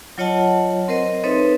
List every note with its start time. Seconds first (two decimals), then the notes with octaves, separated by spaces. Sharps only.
0.18 F#3 F4 C#5 D#5 F#5 A5
0.88 C4 A#4 C5 D#5
1.24 C4 D#4 A4 B4 C#5 E5